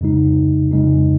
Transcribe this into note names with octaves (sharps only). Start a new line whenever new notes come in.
F2 C#3 G#3 D#4
F2 C#3 G#3 D#4